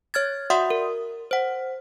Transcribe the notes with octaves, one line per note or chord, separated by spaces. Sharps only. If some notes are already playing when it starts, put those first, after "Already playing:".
C#5 F6 G#6 A6
F#4 D5 E5 F#5 C6 D#6
A#4
C5 F#5